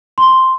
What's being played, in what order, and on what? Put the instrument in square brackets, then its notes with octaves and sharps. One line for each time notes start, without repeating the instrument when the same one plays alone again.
[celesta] C6